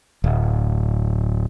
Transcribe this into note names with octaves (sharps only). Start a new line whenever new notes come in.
D1